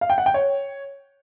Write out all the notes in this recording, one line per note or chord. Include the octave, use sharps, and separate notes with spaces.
F5
G5
F#5
G5
C#5